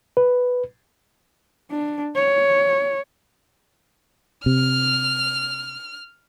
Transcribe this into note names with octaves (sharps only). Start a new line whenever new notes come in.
B4
D4
C#5
C3 F6